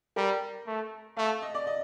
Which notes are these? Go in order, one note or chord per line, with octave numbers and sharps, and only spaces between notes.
G3 A#4
A3
A3 F5
D#5
D5
D#5